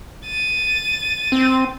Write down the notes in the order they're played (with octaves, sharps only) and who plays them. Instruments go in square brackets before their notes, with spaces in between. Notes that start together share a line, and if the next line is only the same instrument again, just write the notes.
[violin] A6 D#7
[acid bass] C4